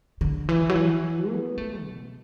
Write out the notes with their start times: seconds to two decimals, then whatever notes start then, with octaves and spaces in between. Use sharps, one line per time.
0.21 D3
0.49 E3
0.69 F#3
0.75 E3
1.30 B3
1.58 A3
1.84 B2